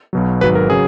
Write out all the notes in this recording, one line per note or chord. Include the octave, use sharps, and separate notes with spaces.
B1 B2 F#3
G#1 G#2 F#3 B4
A#4
C#3 F#3 G#4